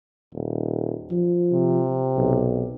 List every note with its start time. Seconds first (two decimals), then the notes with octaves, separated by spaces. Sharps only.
0.34 D#1
1.11 F3
1.53 C3
2.17 B1